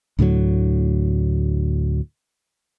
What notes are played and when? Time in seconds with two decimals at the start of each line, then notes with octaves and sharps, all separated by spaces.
0.19 D2 A2 D3 F#3